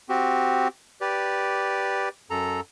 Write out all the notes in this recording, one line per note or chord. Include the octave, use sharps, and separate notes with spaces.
C4 F#4 G4
G4 B4 D5
F#2 A4 A#5